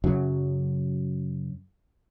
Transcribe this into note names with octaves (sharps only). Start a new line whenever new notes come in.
F#2 C#3 F#3